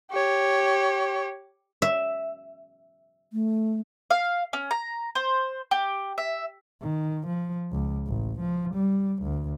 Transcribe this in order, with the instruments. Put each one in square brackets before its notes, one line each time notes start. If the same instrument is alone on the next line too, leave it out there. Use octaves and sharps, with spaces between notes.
[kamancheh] G4 C#5
[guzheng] E5
[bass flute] A3
[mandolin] F5
C#4
A#5
C5
G4
E5
[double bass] D#3
F3
C#2
A1
F3
G3
D2